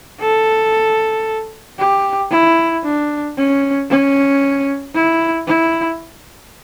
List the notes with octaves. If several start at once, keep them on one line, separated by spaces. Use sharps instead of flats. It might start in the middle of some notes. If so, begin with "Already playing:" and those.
A4
G4
E4
D4
C#4
C#4
E4
E4